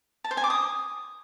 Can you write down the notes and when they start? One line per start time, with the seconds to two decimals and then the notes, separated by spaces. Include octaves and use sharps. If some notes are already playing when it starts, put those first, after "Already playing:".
0.24 A5
0.31 C5
0.37 G#5
0.44 D6
0.50 D#6